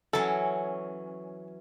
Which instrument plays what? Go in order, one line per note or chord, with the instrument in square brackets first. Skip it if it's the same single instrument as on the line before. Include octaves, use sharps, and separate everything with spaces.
[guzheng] E3 F#3 C#4 [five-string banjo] A4